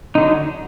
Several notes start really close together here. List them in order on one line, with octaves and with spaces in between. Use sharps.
D#4 D3 F#3